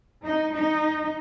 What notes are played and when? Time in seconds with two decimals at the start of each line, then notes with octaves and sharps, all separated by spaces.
0.24 D#4
0.54 D#4